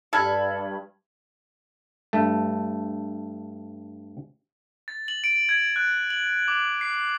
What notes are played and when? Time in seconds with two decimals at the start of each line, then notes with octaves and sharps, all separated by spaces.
0.13 G2 A4 B5 F6 G#6
2.13 G2 A3
4.88 A6
5.08 F#7
5.24 D7
5.49 G#6
5.76 F#6
6.10 F#7
6.48 D6
6.81 C7